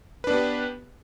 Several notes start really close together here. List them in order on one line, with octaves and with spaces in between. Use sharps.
B4 D4 B3 G4